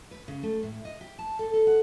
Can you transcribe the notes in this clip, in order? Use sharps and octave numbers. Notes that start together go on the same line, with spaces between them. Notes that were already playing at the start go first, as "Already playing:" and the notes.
B4
C#3
A3
A2
D#5
G4
A5
A4
A4
F#5